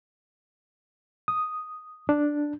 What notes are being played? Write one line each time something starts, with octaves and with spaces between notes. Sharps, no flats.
D#6
D4